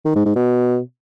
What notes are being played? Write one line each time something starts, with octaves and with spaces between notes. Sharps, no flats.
D#3
G#2
G#2
B2